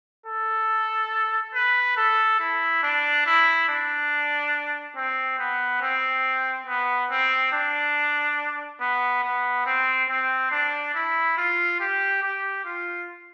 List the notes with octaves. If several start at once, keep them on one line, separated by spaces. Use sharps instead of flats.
A4
B4
A4
E4
D4
E4
D4
C4
B3
C4
B3
C4
D4
B3
B3
C4
C4
D4
E4
F4
G4
G4
F4